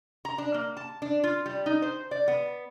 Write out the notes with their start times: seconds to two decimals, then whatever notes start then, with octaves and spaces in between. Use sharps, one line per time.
0.25 A#5
0.38 D4
0.54 A#3
0.77 A5
1.02 D4
1.24 F4
1.46 G3
1.66 D#4
1.82 C5
2.11 D5
2.28 B3